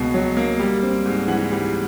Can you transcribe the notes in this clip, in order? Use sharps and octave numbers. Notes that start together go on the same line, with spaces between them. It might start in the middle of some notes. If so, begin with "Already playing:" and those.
Already playing: C#2 B2 A#3 F5
F#3
A#3
G3
C4
G#2
E3 F#5
G3